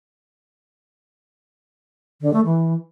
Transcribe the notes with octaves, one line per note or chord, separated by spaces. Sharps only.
D3
A3
E3